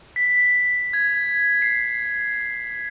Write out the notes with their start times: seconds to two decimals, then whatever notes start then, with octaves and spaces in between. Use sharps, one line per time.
0.16 B6
0.93 G#6
1.62 C7